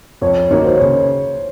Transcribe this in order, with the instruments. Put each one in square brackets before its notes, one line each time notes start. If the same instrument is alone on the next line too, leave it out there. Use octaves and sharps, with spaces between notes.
[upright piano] F2 [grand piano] C#5
[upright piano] D#3 F#3 A#3 D#4 [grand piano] C#5
[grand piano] C5
[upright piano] C#3 [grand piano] C#5